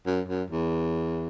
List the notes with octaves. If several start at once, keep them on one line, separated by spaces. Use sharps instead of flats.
F#2
F#2
E2